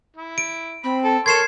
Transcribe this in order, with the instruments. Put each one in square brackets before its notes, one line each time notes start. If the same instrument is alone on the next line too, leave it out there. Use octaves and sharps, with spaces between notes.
[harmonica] E4
[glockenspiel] D7
[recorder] C4 [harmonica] B5
[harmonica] A4
[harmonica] A4 C#5 C6 [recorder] A#4 [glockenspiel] G#6 C7 E7